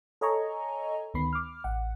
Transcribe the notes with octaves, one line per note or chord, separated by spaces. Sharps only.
A4 C#5 D#5 G#5 A#5 C#6
D2 D#3 B3 B5 C7
D6 F6
A1 F#5